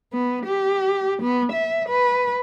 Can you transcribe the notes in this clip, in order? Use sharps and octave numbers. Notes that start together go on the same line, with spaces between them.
B3
G4
B3
E5
B4